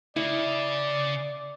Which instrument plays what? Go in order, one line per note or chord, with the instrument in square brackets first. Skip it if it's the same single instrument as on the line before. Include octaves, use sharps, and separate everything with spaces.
[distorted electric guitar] C#3 [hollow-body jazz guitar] E4 [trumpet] D5